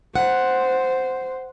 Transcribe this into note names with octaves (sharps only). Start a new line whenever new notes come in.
C5 F#5